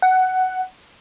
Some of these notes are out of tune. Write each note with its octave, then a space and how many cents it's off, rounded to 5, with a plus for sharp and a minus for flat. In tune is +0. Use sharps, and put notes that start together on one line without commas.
F#5 +10